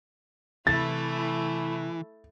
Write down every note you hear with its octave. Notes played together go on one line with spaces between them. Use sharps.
C3 E3 A3 E4 A6